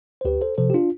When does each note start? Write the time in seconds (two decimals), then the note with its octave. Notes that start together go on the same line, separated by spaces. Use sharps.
0.21 C5
0.25 D2 G4 B4
0.41 A4 C5
0.58 C3 F3 A4 C5
0.70 G4
0.74 D4 F4